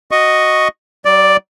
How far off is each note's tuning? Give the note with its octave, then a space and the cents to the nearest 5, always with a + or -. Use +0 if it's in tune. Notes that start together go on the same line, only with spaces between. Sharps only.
F#4 +0 D#5 +0 C#6 +0
F#3 +45 D5 +0